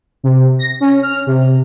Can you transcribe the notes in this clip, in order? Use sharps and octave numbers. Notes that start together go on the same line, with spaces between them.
C3
A#6
C#4
F6
C3